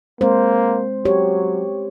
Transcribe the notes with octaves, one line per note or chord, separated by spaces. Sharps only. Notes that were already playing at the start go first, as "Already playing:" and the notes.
G#3 A#3 C4 C5
F#3 G4 C#5